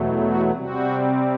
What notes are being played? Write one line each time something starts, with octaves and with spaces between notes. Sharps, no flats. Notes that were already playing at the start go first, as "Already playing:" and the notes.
Already playing: E2 B2 F#3 A3
F#4
C3 G3 C4 F#4